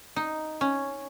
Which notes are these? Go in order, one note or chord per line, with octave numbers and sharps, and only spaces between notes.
D#4
C#4